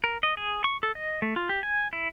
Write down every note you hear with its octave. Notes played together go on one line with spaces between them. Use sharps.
A#4
D#5
G#4
C#6
A4
D#5
A3
F4
G4
G#5
E4